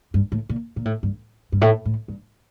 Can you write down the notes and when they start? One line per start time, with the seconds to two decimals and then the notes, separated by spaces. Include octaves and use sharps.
0.14 G2
0.32 A2
0.49 A#2
0.76 A#2
0.85 A2
1.03 G2
1.52 G2
1.61 A2
1.85 A2
2.08 G2